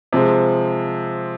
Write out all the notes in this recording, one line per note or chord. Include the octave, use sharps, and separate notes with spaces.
C3 F3 G#3